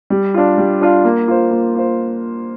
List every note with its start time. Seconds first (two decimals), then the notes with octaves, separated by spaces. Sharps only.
0.10 G3
0.34 D4 F4
0.58 G3
0.81 D4 F4
1.05 A#3
1.28 F4 C5
1.51 A#3
1.75 F4 C5